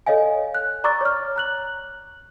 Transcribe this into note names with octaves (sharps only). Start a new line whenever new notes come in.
A4 C#5 D#5 F5 G#5
F#6
D5 A#5 C#6 D6 E6 A6
C#5 F6
A#5 F#6 F#7